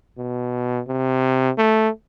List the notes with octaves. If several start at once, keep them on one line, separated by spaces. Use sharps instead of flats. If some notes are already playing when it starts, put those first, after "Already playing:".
B2
C3
A3